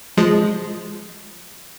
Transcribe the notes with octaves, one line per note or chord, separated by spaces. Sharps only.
F3 G#3